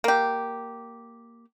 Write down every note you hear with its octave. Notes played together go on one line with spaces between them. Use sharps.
A#3 G4